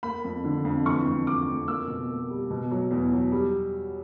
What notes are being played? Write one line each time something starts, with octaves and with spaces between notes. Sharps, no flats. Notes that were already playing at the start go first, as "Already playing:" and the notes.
A#3 B5
F2
D3
F2
E3 C#6
F2
F2 D6
F2
A#3 E6
B2
A#3
G3
B2
F#3
E2
F#3
G3